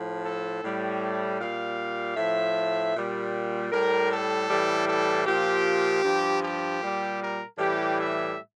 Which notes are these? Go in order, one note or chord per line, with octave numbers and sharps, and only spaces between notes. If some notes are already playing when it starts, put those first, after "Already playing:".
Already playing: A2 F3
A4
A2 G3
A#2 G3 F5
A2 F3 E5
A#2 G3
A2 G3 A#4
A4
A2 E3 G3
A4
A#2 F3 G4
G2 F3
G4
A#2 G3
A#4
A2 E3 G3 G4
E5